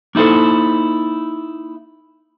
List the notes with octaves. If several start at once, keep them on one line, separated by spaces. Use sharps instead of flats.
A#3 D#4 E4 A4 C5